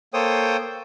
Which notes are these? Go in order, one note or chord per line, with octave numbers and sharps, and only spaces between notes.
A#3 A4 C5 C#5 G5 D#6